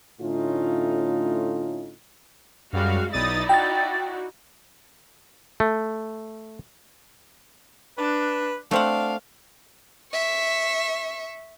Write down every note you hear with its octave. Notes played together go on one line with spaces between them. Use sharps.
A2 D3 A3 C#4 D#4 F4
F#2 G3 G#3 F#4 F5
B1 D#4 E4 D5 D#6 A6
F#4 G5 A6
A3
D4 B4
A3 C4 D4 F5 F#5
E5 C#6